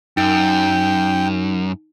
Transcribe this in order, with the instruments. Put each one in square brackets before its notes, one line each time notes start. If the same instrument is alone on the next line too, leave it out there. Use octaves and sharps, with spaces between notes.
[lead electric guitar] F#2 [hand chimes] D#4 D7 [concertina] G5